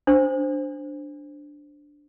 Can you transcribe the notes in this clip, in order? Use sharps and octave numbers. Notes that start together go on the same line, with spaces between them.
D4 C5